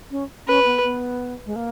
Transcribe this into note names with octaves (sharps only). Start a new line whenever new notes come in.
C#4
C#4 B4
B3
B3
G#3
A#3